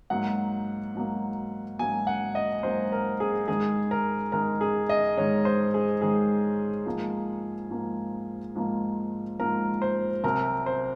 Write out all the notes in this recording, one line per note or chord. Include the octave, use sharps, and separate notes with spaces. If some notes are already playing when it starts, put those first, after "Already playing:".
G#2 F#3 A#3 F#5
G#2 F#3 A#3
G#2 F#3 A#3 G#5
F#5
D#5
G#2 F#3 A#3 C5
A#4
G#4
G#2 D#3 G#3 G#4
A#4
G#2 D#3 G#3 A#4
G#4
D#5
G#2 D#3 G#3 C#5
C5
G#4
G#2 D#3 G#3 G#4
G#2 F3 A#3
G#2 F3 A#3
G#2 F3 A#3
G#2 F3 A#3 A#4
C5
C2 C3 F#3 C4 A#4
C5